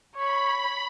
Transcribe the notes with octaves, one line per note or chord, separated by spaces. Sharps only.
C#5 B5